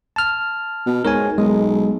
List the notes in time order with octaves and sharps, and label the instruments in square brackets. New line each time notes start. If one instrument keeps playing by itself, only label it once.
[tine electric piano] A5 F6
[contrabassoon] B2
[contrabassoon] G#2 [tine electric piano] A#4 C#5 G#5
[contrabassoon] B1 [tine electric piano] G#3